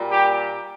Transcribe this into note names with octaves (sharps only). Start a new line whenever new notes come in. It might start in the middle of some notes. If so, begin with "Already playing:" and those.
Already playing: A#2 G3
G4